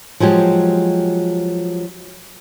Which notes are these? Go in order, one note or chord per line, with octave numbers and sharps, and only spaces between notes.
F3 F#3 G#3 G4